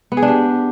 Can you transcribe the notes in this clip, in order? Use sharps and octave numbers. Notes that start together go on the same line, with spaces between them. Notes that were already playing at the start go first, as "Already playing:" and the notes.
B3
G#4
D4
G4